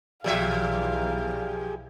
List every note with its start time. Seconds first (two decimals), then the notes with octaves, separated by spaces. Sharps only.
0.24 B1 A#2 E3 F3 G4 G#4 E5 F5